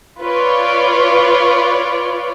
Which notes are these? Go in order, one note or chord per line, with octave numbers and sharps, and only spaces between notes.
F4 B4 C#5 D5